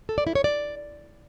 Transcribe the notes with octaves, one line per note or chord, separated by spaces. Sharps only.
A4
D5
E4
C#5
D5